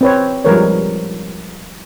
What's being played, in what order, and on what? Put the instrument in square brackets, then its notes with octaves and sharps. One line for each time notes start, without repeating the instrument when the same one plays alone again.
[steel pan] C4 B4 C#5
F3 G3 G#3 A#4 B4 C#5